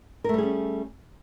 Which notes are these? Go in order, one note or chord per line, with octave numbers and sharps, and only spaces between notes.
G3 A3 C#4 G#4 A#4